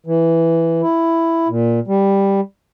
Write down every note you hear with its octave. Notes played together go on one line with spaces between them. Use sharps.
E3
E4
A#2
G3